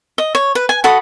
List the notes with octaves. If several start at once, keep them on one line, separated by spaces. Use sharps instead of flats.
D#5
C#5
B4
G#5
F#4 A4 B5 D#6